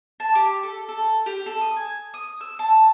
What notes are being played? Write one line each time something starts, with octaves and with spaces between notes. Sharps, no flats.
A5
G4
A4
A4
G4
A4
D#6
G#5
D#6
E6
A5